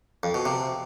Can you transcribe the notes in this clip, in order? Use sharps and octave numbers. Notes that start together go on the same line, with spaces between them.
F2
B2
C3